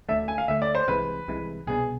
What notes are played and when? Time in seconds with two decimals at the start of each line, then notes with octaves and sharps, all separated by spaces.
0.09 D2 D3 A3 E5
0.28 G#5
0.38 F5
0.48 D2 D3 A3 E5
0.62 D5
0.75 C5
0.88 C2 C3 E3 G#3 B4
1.28 C2 C3 E3 G#3
1.67 C2 B2 B3 D4 G#4